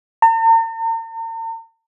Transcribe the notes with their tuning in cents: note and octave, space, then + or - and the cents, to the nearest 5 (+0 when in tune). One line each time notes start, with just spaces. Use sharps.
A#5 -45